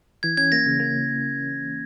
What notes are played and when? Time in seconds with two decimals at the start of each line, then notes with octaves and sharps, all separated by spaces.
0.23 E3 G#6
0.37 C#4 G#6
0.52 A#3 A#6
0.66 C#3
0.80 A#3